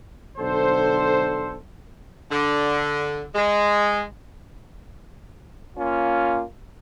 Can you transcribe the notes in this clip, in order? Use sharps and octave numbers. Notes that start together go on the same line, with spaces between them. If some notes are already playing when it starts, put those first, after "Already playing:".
B1 D3 A4 C5
D3
G#3
A#3 C#4 F4